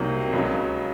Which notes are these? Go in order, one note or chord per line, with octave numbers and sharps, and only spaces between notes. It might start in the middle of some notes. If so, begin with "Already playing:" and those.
Already playing: C2 C3 F#3 A#3 D#4
C#2 C#3 F#3